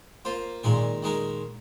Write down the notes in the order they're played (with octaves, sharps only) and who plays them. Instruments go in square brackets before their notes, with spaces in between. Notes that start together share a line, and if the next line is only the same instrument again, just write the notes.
[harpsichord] A#3 F4 C5
[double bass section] A#2 [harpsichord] D#3 G#3 D#4 A#4
[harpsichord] D#3 G#3 D#4 A#4